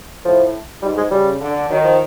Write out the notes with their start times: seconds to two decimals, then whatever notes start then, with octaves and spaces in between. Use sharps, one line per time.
0.25 A2 F3
0.82 G#2 G3
0.97 G#3
1.11 C#3 G3
1.41 D3
1.70 D#3 F#3
1.84 F3